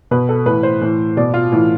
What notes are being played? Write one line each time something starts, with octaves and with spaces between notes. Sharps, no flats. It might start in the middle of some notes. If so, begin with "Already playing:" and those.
B2 B4
A4
A2 E3 B4
C5
A2 E3
B2 D5
F4
A2 E3